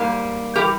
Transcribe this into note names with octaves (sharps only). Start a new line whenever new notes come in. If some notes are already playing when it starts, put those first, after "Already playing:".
Already playing: G#2 G3 A#3
E3 G3 G4 A#4